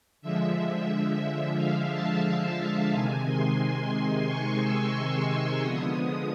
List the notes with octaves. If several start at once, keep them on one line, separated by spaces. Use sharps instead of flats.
D3 F3 G#3 E5
F5
A5
C3 D#3 G#3 G#5
C6
C#6
E6
D3 F3 G#3 B3 D#6